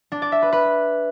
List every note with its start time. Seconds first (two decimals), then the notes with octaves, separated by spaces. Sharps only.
0.12 D4
0.22 D5
0.32 E5
0.42 B4
0.53 B4